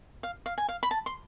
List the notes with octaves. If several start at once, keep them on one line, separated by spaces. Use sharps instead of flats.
F5
F5
G#5
F5
B5
A5
C6